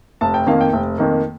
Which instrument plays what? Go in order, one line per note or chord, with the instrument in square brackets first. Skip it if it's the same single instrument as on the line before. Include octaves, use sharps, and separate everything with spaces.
[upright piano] F1 A5
G5
F2 D#3 A#3 F5
G5
F1
F2 D#3 A#3